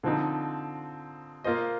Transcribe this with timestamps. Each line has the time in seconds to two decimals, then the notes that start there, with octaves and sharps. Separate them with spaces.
0.03 D3 F3 C4 D#4
1.44 A#3 F4 C5 D#5